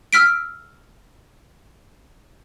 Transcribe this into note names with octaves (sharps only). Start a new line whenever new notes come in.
E6 F6 B6 D7